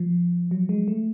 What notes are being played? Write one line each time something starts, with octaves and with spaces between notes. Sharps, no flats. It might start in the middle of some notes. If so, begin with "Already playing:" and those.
Already playing: F3
F#3
G#3
A3